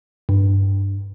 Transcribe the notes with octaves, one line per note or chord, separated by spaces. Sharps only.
G2